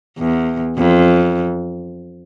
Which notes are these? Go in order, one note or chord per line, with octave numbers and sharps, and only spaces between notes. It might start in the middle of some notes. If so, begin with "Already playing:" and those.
E2
F2